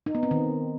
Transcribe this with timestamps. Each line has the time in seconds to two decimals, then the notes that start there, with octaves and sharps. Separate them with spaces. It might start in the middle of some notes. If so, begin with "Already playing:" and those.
0.06 D#4
0.15 B3
0.23 C4
0.31 D#3